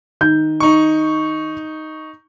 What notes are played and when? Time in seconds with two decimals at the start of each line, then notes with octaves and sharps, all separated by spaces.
0.21 D#3 G6
0.60 D#4 C#6